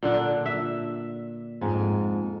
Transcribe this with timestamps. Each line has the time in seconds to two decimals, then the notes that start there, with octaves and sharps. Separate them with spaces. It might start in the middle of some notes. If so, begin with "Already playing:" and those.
0.03 A#2 D3 D4
0.46 E5
1.61 F2 G#2